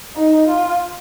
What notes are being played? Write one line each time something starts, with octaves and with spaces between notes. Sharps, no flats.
D#4
F4